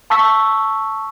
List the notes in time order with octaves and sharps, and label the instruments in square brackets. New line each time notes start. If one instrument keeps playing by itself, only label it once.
[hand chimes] A5 C#6 E6 B6